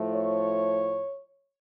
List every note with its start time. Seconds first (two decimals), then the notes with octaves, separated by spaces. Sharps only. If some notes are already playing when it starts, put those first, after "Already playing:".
Already playing: A2 F3 A3
0.13 C#5